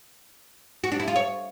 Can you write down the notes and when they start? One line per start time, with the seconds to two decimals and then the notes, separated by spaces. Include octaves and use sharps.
0.84 F#4
0.92 D4
1.00 E4
1.08 F4
1.16 C#5